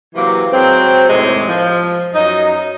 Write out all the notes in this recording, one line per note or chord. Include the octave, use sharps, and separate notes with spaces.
C3 E3 F#3 A#3
F#3 G#3 C4
D#2 A2 C3 G#3
F3
F#2 D#4